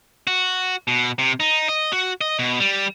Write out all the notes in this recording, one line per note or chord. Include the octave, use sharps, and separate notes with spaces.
F#4
B2
C3
D#4
D#5
F#4
D#5
B2
G3